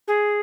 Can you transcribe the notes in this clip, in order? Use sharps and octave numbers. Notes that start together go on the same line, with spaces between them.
G#4